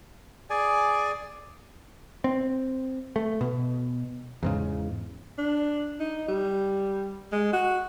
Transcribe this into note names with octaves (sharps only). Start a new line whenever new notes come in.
G#4 D5 G#5
C4
A3
B2
E2 G#2 C#3
D4
D#4
G3
G#3
F#4